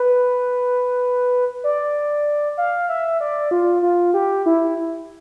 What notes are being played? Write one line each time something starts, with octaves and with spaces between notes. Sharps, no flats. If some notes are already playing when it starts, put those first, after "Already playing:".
Already playing: B4
D5
F5
E5
D5
F4
F4
G4
E4